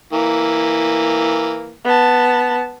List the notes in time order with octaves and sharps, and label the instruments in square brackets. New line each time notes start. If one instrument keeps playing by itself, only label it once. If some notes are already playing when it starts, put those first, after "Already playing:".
[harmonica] E3 A#3
[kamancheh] B3 A5